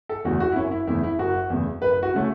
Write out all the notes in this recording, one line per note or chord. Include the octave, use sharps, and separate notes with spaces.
A4
E2 C#3 A3 F#4
F#4
E4
F#1 C#4
E4
E2 C#3 A3 E4
E4
F#1 F#4
E2 C#3 A3
F#1 B4
F#4
C#3 A3 C#4